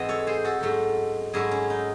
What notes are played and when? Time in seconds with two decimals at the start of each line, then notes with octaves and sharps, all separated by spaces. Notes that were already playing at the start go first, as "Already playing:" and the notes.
Already playing: G#2 E3 C4 F#4 D#5
0.09 A4 C#5
0.27 G#4 C5
0.44 F#4 A4
0.61 G#2 F#3 A3 C#4
1.33 G#2 F#3 A3 C#4 E4 G#4
1.51 C#4
1.70 D#4